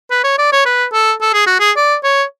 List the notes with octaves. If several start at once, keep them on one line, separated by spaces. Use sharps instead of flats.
B4
C#5
D5
C#5
B4
A4
A4
G#4
F#4
G#4
D5
C#5